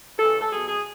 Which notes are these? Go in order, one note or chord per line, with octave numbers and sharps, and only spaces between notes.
C#3 E3 A4
A4
B2 F#3 G#4
G#4